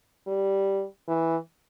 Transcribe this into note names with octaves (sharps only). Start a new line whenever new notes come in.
G3
E3